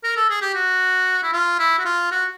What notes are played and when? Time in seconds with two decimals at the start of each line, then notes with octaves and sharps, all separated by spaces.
0.04 A#4
0.17 A4
0.30 G#4
0.42 G4
0.55 F#4
1.23 E4
1.33 F4
1.59 E4
1.79 F#4
1.85 F4
2.11 F#4